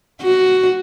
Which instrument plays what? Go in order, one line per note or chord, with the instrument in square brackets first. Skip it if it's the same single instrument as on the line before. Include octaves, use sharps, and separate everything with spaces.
[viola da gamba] F#4